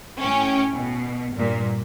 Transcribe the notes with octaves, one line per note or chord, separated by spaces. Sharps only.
A2 C#4 G5
B2
G2 A#2